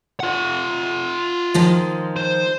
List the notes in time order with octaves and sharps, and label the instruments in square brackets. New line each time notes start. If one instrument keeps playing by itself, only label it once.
[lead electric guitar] F4 F#5
[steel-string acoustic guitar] D#3 F3 G#3
[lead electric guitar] C5